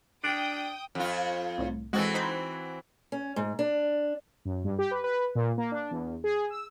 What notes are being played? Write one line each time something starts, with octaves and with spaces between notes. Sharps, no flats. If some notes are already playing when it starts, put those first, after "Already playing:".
D4 G5 D#6
F2 F4
C2 A2
E3 G#3 C4 F#4 A4
D#4 C5 B5
C#4
G#2
D4
F#2
G2
G4
B4
B4
A#2
A#3
D4
E2
G#4
E6